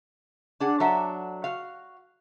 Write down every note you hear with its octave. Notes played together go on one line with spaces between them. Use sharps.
D4 G#4 F#5
F#3 D4 A4 E5 F#5
F#4 F5